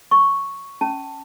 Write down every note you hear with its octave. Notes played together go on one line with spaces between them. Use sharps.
C#6
C#4 A5